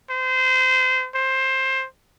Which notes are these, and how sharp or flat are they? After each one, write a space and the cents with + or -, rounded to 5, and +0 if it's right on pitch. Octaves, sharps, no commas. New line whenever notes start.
C5 -25
C5 +15